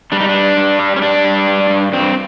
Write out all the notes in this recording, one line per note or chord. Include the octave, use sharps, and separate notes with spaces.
G3 D4
D#4
D4
G2
G2
G3
C#4
G2 D4
G3
G2
G2
G2 C4